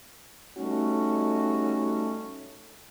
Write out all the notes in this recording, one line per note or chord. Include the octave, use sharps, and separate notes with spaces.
G3 A3 C#4 D#4 F#4